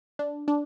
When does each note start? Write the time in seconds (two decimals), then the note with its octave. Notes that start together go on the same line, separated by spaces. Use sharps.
0.19 D4
0.48 D4